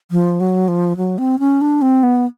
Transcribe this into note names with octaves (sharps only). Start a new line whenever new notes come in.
F3
F#3
F3
F#3
C4
C#4
D4
C4
B3